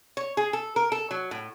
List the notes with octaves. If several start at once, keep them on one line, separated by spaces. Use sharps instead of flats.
C#5
G#4
A4
A#4
A4
F#3
A2